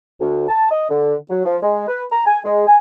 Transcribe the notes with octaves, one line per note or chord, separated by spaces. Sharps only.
D2
A5
D#5
D3
F#3
F3
G#3
B4
A#5
G#5
G#3
G#5